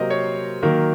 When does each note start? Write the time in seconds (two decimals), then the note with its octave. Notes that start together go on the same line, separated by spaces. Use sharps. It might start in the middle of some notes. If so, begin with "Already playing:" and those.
Already playing: C3 F#3 A#3 A#4 C5 D#5
0.10 C#5
0.63 D#3 F#3 A#3 A#4